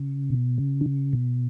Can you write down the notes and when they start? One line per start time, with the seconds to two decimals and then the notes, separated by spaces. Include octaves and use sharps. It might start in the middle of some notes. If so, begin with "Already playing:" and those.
Already playing: C#3
0.30 B2
0.58 C#3
0.81 D3
0.86 C#3
1.13 B2